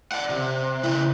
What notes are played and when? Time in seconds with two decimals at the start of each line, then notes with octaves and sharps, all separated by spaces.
0.12 D5 F#5
0.29 C3
0.83 C#3 E4